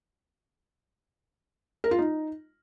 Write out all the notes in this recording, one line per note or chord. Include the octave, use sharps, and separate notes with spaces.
A#4
F4
D#4